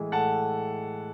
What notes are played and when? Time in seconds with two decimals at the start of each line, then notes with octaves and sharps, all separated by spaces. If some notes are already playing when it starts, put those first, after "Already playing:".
Already playing: A2 E3 G#3
0.12 A2 F#5 A5